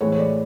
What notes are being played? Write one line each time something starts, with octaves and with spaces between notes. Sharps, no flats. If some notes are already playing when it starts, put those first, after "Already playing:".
A2 E3 G#3 C#5
C#5
D5